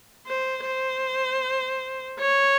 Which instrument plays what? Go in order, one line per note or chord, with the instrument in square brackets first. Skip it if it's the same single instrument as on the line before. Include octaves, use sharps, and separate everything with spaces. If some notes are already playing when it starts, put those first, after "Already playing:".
[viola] C5
C5
C#5